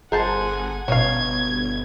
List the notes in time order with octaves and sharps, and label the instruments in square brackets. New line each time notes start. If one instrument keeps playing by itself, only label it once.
[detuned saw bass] G1 [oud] G#4 [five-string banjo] A#4 C5 A5 [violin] F#5 G#5
[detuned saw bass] G1 [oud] B2 C#4 [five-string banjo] C#5 F5 [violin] G#6